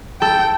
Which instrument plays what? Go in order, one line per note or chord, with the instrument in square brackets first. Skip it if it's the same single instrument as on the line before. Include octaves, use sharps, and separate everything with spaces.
[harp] A4 [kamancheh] G5